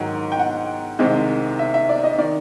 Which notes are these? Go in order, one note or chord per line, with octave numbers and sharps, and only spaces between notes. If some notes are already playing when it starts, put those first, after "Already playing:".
Already playing: G#2 D#3 F#3 G5
G5
F#5
C2 C3 D#3 G#3 C4
E5
E5
D5
D#5
D#3 D5